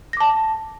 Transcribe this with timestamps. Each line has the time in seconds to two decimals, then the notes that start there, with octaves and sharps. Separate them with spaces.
0.13 A#6
0.17 D6
0.20 A5